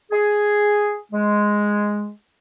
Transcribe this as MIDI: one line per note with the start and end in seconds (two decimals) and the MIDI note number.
0.11 0.97 68
1.12 2.09 56